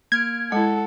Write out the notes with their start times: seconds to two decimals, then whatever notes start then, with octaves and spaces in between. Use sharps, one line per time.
0.12 A#3 F6 G#6 D7
0.52 G#3 E4 A4 F#5